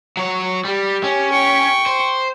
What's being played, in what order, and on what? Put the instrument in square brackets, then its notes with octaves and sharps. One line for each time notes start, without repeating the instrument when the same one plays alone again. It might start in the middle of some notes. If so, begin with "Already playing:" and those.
[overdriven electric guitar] F#3 C#5
[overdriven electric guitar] G3 [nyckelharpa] G4
[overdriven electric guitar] C#4
[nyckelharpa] G5 C#6
[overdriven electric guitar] C5